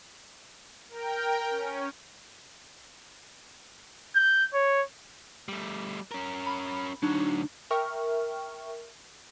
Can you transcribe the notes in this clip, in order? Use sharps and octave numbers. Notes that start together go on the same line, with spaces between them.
A#4 G5
C#4
G6
C#5
G3 A3
C#4 A#4
B5
D2 F#3 D4 D#4
A#4 E5 G5 C#6 F6